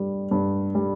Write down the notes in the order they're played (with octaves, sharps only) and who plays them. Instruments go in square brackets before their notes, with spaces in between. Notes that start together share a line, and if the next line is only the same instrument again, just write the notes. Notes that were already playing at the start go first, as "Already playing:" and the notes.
Already playing: [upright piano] G2 G3
G2
G3